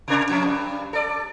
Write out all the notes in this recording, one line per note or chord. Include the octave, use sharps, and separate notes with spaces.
C3 D4 A#4
F2 C#4
G2
A4 D5